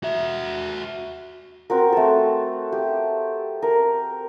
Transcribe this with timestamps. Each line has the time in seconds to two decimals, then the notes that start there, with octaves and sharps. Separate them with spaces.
0.03 F#4 E5
1.70 C4 F#4 A#4
1.92 A3 A4
2.72 G4
3.62 A#4